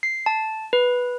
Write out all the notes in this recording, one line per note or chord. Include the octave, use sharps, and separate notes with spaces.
C7
A5
B4